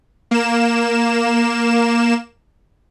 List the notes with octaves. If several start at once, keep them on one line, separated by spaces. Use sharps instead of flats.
A#3 E7